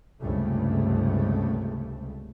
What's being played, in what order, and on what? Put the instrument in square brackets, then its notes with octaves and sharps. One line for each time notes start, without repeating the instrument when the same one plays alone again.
[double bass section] C#2 G2 C3 A3